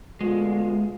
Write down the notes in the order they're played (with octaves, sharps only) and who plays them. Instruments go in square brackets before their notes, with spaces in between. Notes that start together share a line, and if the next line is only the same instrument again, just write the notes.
[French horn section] D2 B2 F4 [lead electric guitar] G#3